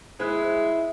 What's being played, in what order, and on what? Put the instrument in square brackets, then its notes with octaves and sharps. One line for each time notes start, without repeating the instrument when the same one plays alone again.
[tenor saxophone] G#3 [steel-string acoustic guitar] E4 [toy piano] C5